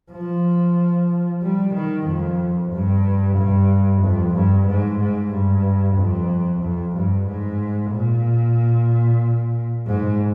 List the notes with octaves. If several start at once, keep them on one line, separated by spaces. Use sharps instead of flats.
F3
G3
D#3
F2
G2
G2
F2
G2
G#2
G#2
G2
F2
F2
G2
G#2
A#2
G#2